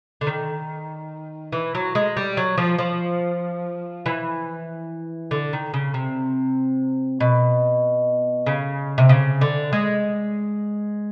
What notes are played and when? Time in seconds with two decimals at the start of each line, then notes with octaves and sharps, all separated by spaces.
0.21 D3
0.27 D#3
1.52 E3
1.75 F#3
1.95 G#3
2.17 G3
2.37 F#3
2.58 F3
2.79 F3
4.06 E3
5.31 D3
5.53 D#3
5.74 C#3
5.94 C3
7.20 B2
8.46 C#3
8.98 C3
9.09 C#3
9.41 D3
9.73 G#3